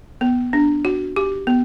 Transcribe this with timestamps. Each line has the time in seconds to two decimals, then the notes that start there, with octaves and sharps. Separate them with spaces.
0.21 B3
0.53 D4
0.85 F#4
1.16 G4
1.47 B3